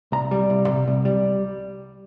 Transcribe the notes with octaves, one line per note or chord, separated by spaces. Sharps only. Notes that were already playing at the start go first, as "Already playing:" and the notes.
C2 A#5
G3
C2
C3
C2
G3